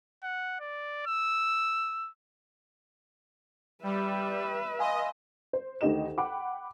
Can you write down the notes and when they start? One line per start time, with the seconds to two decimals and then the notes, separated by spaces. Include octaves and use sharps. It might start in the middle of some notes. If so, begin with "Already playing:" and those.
0.24 F#5
0.60 D5
1.06 E6
3.83 G3 B4 E5
4.79 D#5 F5 G#5 C6
5.53 C5
5.81 D2 D#3 D#4 G4 D#5 E7
6.18 F#5 G5 B5 D6